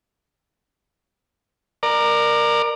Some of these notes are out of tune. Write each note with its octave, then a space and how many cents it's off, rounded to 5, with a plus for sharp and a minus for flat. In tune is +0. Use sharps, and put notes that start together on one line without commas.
A#4 +0 D5 +25